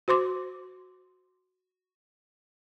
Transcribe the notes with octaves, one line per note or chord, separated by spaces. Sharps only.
F#4 C5 C6 D6